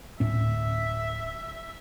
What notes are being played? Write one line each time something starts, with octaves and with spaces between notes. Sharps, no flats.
D1 A2 C#4 E5